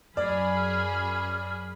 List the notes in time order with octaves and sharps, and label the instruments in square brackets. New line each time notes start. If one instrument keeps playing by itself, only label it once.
[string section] F#2 G#4 B5 [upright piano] D5 [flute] F6